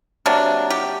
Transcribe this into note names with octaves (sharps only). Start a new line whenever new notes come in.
C3 F#3 A#3 D4
G4